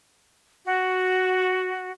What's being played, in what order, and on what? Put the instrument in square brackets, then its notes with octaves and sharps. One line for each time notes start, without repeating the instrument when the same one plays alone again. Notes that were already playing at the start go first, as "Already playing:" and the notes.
[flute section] F#4